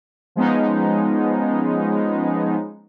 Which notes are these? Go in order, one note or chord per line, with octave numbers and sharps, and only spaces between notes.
F3 G#3 B3 C#4 D#4